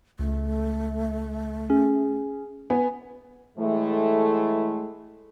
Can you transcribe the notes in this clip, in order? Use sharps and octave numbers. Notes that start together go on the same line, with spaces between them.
C#2 A3
C#4 G#4
B3 G#5
A2 E3 G#3 A3